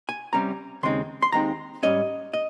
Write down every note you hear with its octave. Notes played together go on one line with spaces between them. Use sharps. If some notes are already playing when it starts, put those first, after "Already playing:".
G#5
C2 C3 G3 C#4 A#5
D#2 C#3 G#3 C4 D#4 C6
C6
D#2 C#3 G#3 C4 D#4 A#5
G#2 G3 C#4 D#5
D#5